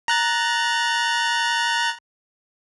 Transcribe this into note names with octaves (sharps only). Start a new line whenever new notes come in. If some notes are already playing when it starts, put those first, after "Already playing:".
A#5 F#6 A6